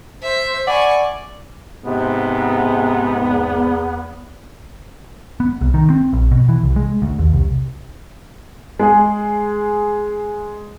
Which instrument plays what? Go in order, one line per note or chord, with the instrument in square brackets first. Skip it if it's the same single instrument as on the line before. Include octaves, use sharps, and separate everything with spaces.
[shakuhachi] C5 [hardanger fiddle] E5
[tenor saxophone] D5 [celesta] F#5 [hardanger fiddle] G#5 C#6 [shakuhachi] B5
[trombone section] G#2 C3 [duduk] B3
[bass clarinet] E2
[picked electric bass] B3
C2
D#3
C4
A#1
B2
E3
C2
G#3
D2
D#2
C2
[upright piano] G#3 G#4